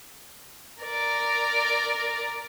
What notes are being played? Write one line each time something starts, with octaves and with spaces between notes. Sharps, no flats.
A#4 D5